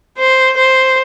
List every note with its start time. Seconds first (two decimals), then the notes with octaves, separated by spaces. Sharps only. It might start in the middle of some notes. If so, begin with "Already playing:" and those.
0.18 C5
0.57 C5